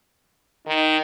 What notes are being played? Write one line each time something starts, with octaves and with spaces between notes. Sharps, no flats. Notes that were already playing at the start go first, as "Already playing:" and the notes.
D#3 D#4